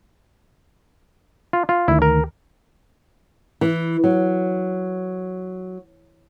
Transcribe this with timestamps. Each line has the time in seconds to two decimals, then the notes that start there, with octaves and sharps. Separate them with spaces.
1.53 F4
1.69 F4
1.88 D2 D#3 E4
2.02 A#4
3.61 E3
4.04 F#3